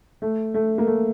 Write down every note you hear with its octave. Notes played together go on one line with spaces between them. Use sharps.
A3
A3
A#3
A3